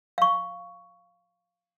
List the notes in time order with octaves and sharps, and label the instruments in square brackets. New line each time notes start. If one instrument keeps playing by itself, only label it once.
[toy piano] F5 C#6